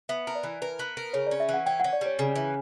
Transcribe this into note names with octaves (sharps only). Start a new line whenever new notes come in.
B3 E5
A#4
D5
E3
A#4 B4
B3
A#4
C#3 C#5
C#4 D5
E5
E3 F#5
C#4 G5
C#4 F#5
D5
G3 C#5
C#3
E3